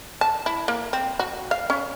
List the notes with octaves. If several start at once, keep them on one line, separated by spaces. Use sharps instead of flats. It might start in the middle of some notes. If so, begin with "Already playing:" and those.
A5
E4
A#3
C4
F#4
F5
C#4